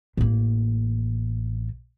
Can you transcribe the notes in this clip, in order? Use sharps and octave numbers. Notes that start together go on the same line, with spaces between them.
A1 A#3